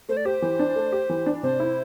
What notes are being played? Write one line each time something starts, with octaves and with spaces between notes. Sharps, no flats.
A3 C5
D5
G4 C5
E3
D4
A3
G4
E3
D4
C3 C5
E4